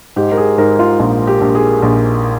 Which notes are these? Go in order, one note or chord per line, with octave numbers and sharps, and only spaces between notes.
G#2 G4
A#4
G#4
G#2 A#4
F4
A#1 F4
G4
A#1
G#4
A#1